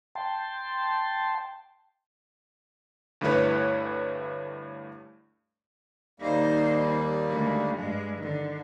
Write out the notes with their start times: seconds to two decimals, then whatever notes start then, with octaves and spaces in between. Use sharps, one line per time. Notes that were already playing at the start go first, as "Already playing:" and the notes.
0.15 G5 A5 C6
3.21 D2 G2 A3 E4 B4 C#5
6.20 D#2 G3 A#3 D#4 C5
7.29 D2 G#3
7.76 G2 G#3
8.18 D3 D#3